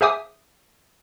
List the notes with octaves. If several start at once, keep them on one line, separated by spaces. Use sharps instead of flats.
G#4 C5 E5 G#5 D6 D#6